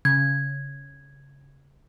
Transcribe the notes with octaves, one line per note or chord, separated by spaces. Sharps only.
C#3 G#6